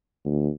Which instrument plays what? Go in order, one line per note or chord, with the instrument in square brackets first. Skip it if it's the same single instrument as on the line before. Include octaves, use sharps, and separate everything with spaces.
[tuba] D2